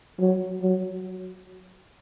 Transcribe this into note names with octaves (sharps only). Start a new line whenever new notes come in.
F#3
F#3